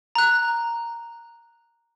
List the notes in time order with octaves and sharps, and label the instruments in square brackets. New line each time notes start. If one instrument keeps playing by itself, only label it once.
[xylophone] A#5 F#6